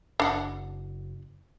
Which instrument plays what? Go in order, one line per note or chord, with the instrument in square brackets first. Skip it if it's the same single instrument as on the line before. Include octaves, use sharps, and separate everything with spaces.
[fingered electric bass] F#1 [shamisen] D4 F#5